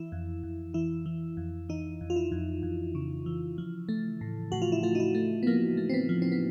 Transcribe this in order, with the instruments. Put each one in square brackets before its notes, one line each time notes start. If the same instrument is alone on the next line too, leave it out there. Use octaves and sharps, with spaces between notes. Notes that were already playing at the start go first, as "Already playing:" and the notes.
Already playing: [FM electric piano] E3 E4
F2
F2
E3 E4
E3
F2
E3 D#4
F2
F4
E4
F2
F2
C#3
E3
F3
A3
A2
A2 F#4
F4
E4
A3 F4
D#4
E4
A3
B3
F3 A#3
A3
C4
B3
F3
C4
B3